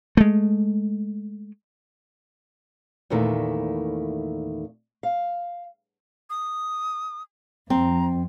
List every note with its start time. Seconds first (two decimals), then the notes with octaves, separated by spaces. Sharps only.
0.17 G#3 A3
3.10 E2 A#2 D#3 A3 E4
5.03 F5
6.30 D#6
7.70 F2 C4 A#5